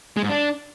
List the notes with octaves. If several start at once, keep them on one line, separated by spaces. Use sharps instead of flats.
G#3
G#2
D4